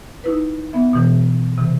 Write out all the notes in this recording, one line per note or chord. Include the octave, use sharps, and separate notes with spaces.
D#4 E4 B4
B3 E5
B2 E3
C3 E3